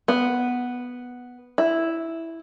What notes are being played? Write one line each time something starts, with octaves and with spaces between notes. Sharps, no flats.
B3
E4